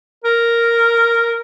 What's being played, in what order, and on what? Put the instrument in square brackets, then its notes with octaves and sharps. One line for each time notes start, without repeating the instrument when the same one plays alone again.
[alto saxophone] A#4